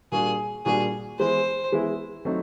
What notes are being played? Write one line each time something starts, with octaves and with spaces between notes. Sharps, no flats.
A#2 G3 A#3 D4 F#4 G#4
A#2 G3 A#3 D4 F#4 G#4
E3 G#3 B3 E4 C5
E3 G#3 B3 E4
F#3 A3 C4 D#4